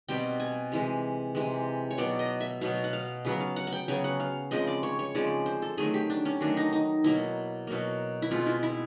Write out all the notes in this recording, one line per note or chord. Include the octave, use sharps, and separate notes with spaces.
B2 G3 C4 G5
G#5
C3 E3 G#3
C3 E3 G#3
C#5
B2 F#3 B3 D5
D#5
E5
B2 F#3 B3 F5
F#5
F5
C#3 F#3 B3
F5
F#5
F#5
G5
C#3 F#3 B3 G#5
F#5
F5
C#3 F3 G#3 C4 D#5
D5
C#5
C#5
C#3 F3 G#3 C4 D5
C5
A4
D#3 F#3 A3 G#4
G4
D4
C#4
D#3 F#3 A3 D4
D#4
D#4
B2 F#3 A#3 E4
B2 F#3 A#3
E4
B2 G#3 C4 F4
E4
E4